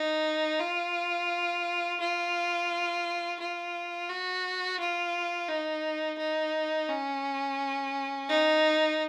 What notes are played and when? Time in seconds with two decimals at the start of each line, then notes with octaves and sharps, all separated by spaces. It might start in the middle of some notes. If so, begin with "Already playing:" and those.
Already playing: D#4
0.60 F4
2.00 F4
3.39 F4
4.09 F#4
4.79 F4
5.48 D#4
6.18 D#4
6.88 C#4
8.29 D#4